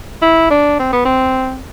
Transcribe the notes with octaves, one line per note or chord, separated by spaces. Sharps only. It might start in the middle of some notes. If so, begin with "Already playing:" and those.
E4
D4
C4
B3
C4